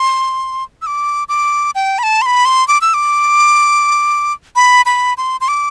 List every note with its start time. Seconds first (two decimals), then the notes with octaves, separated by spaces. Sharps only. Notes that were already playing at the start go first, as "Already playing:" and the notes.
Already playing: C6
0.82 E6
0.87 D6
1.29 D6
1.75 G5
1.99 B5
2.03 A5
2.22 C6
2.26 B5
2.45 C6
2.68 D6
2.81 E6
2.94 D6
4.56 B5
4.86 B5
5.18 C6
5.41 C6
5.48 D6